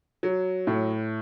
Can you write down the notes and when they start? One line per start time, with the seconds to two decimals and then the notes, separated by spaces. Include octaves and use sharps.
0.23 F#3
0.67 A2